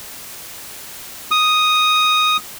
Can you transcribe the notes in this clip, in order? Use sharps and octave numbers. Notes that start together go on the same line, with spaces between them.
D#6